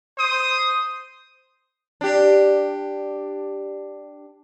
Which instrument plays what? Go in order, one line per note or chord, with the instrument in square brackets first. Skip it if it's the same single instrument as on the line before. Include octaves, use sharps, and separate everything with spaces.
[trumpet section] C5 D#6
[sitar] D4 G4